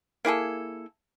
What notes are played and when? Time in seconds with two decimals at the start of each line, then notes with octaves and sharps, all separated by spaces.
0.25 A#3 E4 G#4 A4